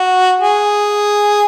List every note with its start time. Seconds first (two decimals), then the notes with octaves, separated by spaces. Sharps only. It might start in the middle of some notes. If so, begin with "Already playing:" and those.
Already playing: F#4
0.40 G#4